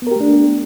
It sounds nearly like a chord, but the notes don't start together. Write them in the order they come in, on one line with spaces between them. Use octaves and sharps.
B3 A#4 G4 A3 D4